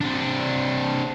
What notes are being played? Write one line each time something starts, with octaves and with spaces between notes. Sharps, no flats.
C3 D4